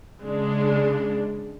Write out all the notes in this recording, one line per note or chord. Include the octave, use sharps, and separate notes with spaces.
C#3 G#3 D4